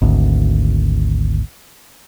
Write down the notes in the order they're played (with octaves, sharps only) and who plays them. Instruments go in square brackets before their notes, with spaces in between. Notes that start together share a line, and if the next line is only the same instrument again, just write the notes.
[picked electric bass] G#1 D2